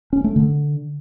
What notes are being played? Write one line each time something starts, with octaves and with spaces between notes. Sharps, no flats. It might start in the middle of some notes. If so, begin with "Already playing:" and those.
C#4
A3
D3